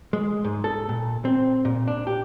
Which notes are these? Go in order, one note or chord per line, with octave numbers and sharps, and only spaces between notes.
G#3
G#2
A4
A#2
C4
A#2
D4
G4